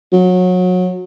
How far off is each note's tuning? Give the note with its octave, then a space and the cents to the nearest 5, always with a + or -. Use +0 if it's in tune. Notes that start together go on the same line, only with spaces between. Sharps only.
F#3 -25